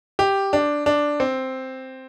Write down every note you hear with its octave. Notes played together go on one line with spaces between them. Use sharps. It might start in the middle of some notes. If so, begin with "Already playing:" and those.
G4
D4
D4
C4